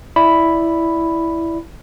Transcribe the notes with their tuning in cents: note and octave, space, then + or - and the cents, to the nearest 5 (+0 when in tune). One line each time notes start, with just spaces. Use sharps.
E4 +0 D5 +0 B5 +0